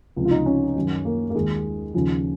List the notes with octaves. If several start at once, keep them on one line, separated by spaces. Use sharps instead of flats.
C#2 C3 F3
F4
D#4
C#4
F#2 D#3
A#3
A#3
D#2 D#3 G#3
D#2 C#3 F3